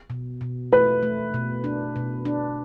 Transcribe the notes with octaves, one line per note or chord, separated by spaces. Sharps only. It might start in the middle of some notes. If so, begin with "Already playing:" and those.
B2
B2
A3 B4
A3
B2
D4
B2
D4